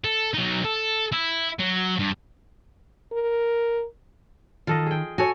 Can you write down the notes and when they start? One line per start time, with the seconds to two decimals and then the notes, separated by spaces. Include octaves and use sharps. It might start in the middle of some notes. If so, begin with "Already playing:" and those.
0.04 A4
0.34 F#3 D#4
0.65 A4
1.12 E4
1.59 F#3
1.99 G2
3.12 A#4
4.67 D#3 F4 A4 D#5
4.86 G#4 G5
5.18 F#4 A4 C#5 G#5